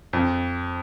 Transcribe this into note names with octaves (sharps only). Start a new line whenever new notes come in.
F2